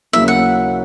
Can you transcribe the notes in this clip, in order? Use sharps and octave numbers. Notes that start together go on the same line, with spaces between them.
D#2 C#3 F#3 A#3 E4 E5
F#5